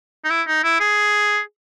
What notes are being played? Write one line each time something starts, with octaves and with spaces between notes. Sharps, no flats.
D#4
E4
D#4
E4
G#4